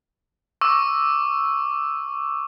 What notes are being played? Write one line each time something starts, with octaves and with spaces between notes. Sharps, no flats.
C#6 D6 E6